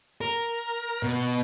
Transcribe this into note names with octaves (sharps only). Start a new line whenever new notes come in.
A#4
B2